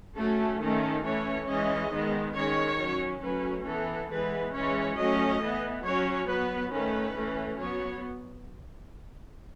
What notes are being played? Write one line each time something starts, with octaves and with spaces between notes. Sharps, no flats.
F#3 A3 C#4 A4
D#3 A3 C#4 A4
E3 A3 C#4 C#5
E3 G#3 C#4 D#5
D#3 G#3 B3
D#3 G#3 C#4 C#5
F#3 C#4
F#3 A3 C#4 B4
E3 B3 A4
E3 G#3 B3 B4
E3 G#3 C#4 C#5
F#3 A3 C#4 D#5
E3 B3
F#3 C#4 C#5
F#3 B3 B4
D#3 A3 C#4 B4
E3 A3 C#4
F#3 B3 C#5